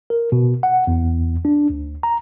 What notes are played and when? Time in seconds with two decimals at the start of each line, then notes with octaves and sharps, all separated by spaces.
0.10 A#4
0.32 B2
0.63 F#5
0.87 E2
1.45 D4
1.70 D2
2.03 A#5